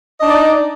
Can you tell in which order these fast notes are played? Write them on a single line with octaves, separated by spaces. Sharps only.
D#5 D4 D#4 D5